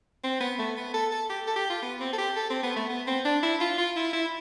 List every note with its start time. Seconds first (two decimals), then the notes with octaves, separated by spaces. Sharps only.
0.23 C4
0.40 B3
0.58 A3
0.77 B3
0.94 A4
1.12 A4
1.29 G4
1.47 A4
1.56 G4
1.70 F4
1.82 B3
2.00 C4
2.13 A4
2.18 G4
2.36 A4
2.50 C4
2.63 B3
2.76 A3
2.89 B3
3.07 C4
3.25 D4
3.43 E4
3.61 F4
3.78 F4
3.96 E4
4.13 E4